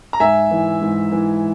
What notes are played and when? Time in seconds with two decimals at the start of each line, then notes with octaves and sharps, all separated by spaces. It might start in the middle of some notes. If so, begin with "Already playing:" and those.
0.13 A#5
0.20 G#2 E5 G#5
0.51 E3
0.82 G#2
1.12 E3